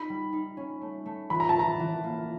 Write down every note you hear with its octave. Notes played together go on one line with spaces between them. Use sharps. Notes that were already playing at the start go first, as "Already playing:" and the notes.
Already playing: D#4 B5
G3
D#4
C#4
A3
A3
E3 B5
A#5
A5
E3 A#5
E3
A#3